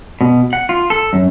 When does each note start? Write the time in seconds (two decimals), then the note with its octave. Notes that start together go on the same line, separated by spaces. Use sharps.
0.21 B2
0.53 F#5
0.69 F4
0.90 A4
1.13 F#2